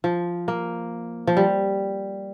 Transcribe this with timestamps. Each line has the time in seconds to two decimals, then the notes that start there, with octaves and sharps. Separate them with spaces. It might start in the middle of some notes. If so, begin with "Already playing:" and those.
0.04 F3
0.48 A#3
1.27 F3
1.37 G3